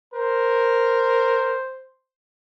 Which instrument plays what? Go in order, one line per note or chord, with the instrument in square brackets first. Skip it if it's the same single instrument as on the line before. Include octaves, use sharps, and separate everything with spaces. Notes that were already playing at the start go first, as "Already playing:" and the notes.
[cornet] A#4 [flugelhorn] C5